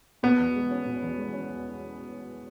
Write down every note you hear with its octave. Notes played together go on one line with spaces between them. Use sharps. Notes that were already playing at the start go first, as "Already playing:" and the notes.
B2 B3
E2
G#3
C#4
B2
E2
G#3
C#4